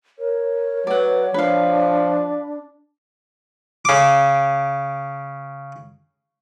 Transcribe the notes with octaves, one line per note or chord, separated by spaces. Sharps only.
A#4 C#5
F#3 B4 D5 F#5
F3 D4 B4 F5
C#3 D6